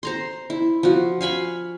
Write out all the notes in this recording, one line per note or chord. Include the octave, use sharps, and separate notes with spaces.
C5 A#5 C6
E4
F3 F#4
F5 G#5 B5 C#6